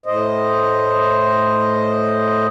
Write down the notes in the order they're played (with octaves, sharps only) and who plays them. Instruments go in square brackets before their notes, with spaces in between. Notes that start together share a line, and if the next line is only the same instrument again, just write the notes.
[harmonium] A2 C5 D#5